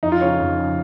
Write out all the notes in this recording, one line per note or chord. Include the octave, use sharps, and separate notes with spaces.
F2 D#4
F4
C#3 C#5
F2
C#3